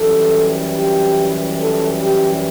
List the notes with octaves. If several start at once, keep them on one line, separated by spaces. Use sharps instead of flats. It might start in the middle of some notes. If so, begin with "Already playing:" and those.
Already playing: F#2 E3 G3 A4
G4
A4
G4